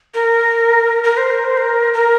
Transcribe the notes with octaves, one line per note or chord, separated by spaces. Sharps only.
A#4
A#4
C5
A#4
C5
A#4
A#4